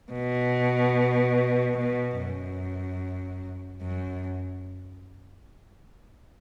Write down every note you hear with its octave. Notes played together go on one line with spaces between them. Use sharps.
B2
B2
F#2
F#2